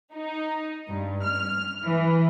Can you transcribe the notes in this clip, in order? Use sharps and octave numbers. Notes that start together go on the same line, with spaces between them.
D#4
G2
F6
E3